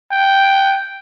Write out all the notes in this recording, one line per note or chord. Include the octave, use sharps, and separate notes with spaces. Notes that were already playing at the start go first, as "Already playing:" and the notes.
G5